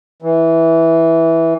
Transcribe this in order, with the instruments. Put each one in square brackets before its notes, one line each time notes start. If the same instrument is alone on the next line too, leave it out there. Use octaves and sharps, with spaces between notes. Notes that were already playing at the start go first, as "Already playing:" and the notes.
[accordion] E3